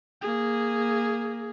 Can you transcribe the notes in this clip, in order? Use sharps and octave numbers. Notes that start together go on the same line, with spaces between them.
A#3 G#4